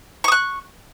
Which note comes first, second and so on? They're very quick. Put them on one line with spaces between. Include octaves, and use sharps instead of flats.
C#6 D#6 F#6